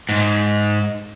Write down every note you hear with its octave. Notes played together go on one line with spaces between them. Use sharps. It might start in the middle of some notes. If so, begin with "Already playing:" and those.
G#2